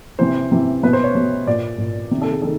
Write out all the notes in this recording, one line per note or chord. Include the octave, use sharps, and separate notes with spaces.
C3 E3 C5
C3 E3
B2 B4
C5
C#5
B2
A#2 D5
A#2
C3 D#3
A4
G#4
D#3 A4